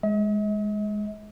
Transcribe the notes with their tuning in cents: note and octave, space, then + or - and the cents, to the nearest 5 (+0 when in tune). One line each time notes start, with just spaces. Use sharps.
G#3 +0 D#5 +45